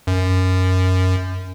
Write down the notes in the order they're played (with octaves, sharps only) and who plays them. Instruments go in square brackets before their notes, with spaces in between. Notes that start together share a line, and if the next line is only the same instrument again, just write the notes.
[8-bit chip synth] F#2